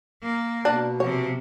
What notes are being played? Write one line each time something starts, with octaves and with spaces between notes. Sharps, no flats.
A#3
B2 D4
C3 F3 C#5